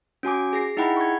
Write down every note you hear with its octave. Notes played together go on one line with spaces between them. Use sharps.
C#4 F#4 G#5 D6
G#4 A#6 C7
D#4 E4 G#4 F#5 G5 B5
C#6 G#6